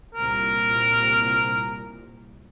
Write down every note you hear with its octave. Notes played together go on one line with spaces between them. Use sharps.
C2 A#2 A#4